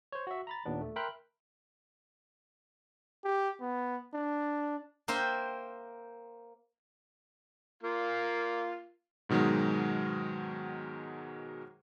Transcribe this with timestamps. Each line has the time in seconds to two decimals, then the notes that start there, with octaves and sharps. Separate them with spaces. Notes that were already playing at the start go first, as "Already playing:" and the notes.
0.12 C5 C#5
0.27 F#4 E5
0.47 A#5 B5 A6
0.65 D#2 A#2 B3 D4
0.81 A3
0.96 A#4 E5 G5 B5 C6 F#6
3.24 G4
3.60 B3
4.14 D4
5.08 A#3 A#4 C5 E5 G5
7.83 A#3 F4
9.29 G#2 B2 D#3 F#3 G#3